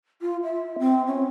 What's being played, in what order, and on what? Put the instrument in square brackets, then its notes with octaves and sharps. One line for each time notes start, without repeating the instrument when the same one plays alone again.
[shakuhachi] F4
E5
C4
C#4